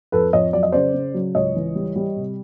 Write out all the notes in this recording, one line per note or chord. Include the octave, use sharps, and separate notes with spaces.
F2 A4 B4
F2 C#5 D#5
F#3 D5
D#5
C#3 C5 D5
C#3
F#3
C#2 C#5 D#5
E3
G3
G3
C3